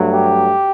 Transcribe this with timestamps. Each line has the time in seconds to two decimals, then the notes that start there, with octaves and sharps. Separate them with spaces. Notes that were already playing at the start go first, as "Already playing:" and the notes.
Already playing: G2 F#3 A3
0.11 G4